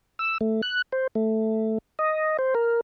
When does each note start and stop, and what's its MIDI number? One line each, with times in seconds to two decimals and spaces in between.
0.19 0.38 88
0.41 0.61 57
0.62 0.82 90
0.92 1.07 72
1.15 1.78 57
1.99 2.37 75
2.39 2.54 72
2.55 2.81 70